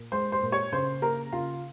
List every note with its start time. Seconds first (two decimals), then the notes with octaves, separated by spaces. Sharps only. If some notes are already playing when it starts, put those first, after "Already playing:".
Already playing: A#2
0.12 G#3 C5 C6
0.32 C5 C6
0.42 A#2
0.52 C#5 C#6
0.72 C#3 C5 C6
1.02 A#3 A#4 A#5
1.33 C#3 F4 F5